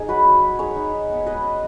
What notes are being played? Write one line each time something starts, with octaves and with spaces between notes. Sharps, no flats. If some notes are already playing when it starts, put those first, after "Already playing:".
Already playing: D#4 G#4
F#3 F#4 B4
F#3
D#4
D#4 G#4 C#5
D#4
D#4
B3
G#3 B4 D#5
C#4